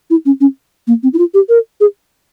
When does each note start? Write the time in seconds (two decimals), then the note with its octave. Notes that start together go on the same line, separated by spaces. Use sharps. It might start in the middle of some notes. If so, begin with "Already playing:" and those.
0.10 E4
0.26 C#4
0.41 C#4
0.87 A#3
1.03 C4
1.13 E4
1.18 F4
1.34 G4
1.49 A#4
1.80 G#4